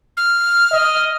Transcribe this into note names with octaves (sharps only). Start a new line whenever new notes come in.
F6
D#5